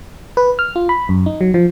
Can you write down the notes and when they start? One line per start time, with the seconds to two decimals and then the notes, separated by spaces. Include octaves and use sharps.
0.37 B4
0.59 F6
0.76 F4
0.89 B5
1.09 F#2
1.26 D#4
1.41 F#3
1.54 F3